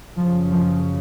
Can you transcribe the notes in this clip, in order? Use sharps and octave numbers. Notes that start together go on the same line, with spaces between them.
F#2 C#3 F3
F3